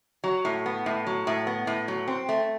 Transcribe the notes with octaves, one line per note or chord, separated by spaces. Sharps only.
F#3
A2
B3
A2
F#3
A2
B3
A2
F#3
C4
A3